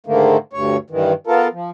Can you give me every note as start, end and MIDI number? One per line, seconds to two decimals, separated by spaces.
0.07 0.37 44
0.07 0.37 50
0.07 0.37 51
0.07 0.37 57
0.07 0.37 58
0.53 0.77 38
0.53 0.77 43
0.53 0.77 73
0.90 1.13 43
0.90 1.13 51
0.90 1.13 52
1.27 1.48 59
1.27 1.48 65
1.27 1.48 69
1.27 1.48 70
1.52 1.70 53